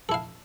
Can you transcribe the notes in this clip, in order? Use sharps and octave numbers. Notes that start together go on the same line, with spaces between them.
E4 A4 F5